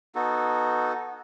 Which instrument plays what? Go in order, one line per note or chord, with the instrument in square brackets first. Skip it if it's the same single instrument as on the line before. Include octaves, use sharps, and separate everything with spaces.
[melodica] B3 D#4 F#4 A4